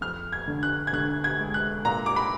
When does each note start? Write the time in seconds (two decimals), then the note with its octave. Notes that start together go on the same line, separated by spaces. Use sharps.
0.01 F2 F6
0.32 G#6
0.48 D3
0.63 F#6
0.87 G#6
0.93 D3 F#6
1.24 G#6
1.39 G#3
1.54 F#6
1.85 A#2 A#5
2.06 D6
2.16 B5